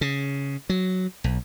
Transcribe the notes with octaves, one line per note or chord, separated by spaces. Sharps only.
C#3
F#3
B1